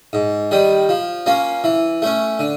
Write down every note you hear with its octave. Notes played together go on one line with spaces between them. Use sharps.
G#2
D#3 G3
F3
A#3 C#4 F4
E3
A3 C#4
D3